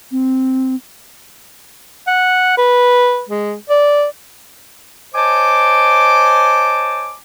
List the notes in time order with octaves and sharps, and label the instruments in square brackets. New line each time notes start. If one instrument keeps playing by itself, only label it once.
[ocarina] C4
[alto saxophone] F#5
B4
G#3
D5
[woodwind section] C5 C#5 D#5 G#5 A5 D6